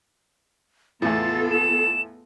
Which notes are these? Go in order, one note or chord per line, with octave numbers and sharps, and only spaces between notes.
E2 A2 B3 F4 A4 A6
E7